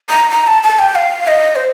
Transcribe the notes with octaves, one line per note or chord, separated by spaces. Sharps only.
A#5
A#5
A5
A5
G5
F5
D#5
C5